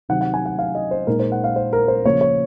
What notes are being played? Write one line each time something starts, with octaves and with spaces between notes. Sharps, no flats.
C3 D#3 F#3 C4 D#4 F#5
F#5
G#5
F#5
F5
D#5
C5
A#2 G#3 D#4 A#4
C5
F#5
F5
C5
A#4
C5
C#3 F3 A#3 C#5
C#5